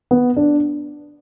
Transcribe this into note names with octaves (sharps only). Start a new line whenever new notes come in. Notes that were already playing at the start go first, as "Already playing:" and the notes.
B3
D4